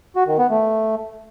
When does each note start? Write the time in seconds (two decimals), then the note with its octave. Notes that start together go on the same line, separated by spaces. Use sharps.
0.16 F#4
0.27 D#3
0.38 B3
0.50 A3